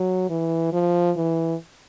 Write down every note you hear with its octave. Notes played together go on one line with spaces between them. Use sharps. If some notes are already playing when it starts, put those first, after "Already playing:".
Already playing: F#3
E3
F3
E3